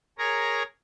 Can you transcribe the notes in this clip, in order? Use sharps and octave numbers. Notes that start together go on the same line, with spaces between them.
G#4 A#4 C#5 A#5